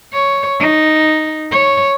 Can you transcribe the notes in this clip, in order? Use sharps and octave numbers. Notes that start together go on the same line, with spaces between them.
C#5
D#4
C#5